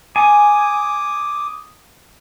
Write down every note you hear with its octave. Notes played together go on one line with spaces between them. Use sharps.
G#5 D6 D#6